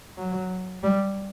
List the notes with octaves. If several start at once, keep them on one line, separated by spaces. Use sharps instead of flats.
F#3
G3